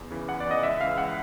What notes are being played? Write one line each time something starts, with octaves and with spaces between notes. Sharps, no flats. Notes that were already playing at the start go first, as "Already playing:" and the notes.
Already playing: E2
C#3 E3
E2 F#5
D5
C#3 E3 D#5
C#2 E5
C#3 E3 F5
C#2 F#5